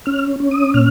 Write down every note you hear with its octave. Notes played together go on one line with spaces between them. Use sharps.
C#4 F6
C#4
D#6
A#2 F6